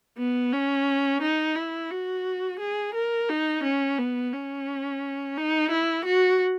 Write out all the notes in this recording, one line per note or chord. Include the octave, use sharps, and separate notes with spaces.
B3
C#4
D#4
E4
F#4
G#4
A#4
D#4
C#4
B3
C#4
D#4
E4
F#4